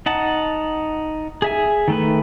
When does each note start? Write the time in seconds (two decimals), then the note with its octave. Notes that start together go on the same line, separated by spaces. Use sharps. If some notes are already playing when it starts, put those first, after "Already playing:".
0.06 D#4 F#5 A5
1.42 G#4 E5 G#5
1.88 D#3 A3 B4